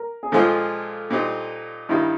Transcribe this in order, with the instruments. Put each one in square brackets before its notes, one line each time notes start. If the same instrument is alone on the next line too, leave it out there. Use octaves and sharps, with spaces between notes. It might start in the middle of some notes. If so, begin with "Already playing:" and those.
Already playing: [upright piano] A#4
G#4
[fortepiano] A#2 F3 G#3 C4 F4 [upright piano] A4
[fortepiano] A#2 G3 C4 D#4
[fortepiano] G2 D#3 G3 A#3 [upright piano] E4